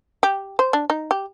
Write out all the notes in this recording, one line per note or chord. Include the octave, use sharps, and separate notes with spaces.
G4
C5
D4
D#4
G4